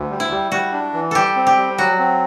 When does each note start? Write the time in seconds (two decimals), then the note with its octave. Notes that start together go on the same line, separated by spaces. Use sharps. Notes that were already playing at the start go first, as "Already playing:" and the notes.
Already playing: D2
0.10 G3
0.20 E4
0.31 G3
0.52 G3 F#4
0.73 D4
0.94 E3
1.11 G3 G4 A4
1.36 C4
1.47 G4
1.57 G3
1.78 F#3 F#4
1.99 C4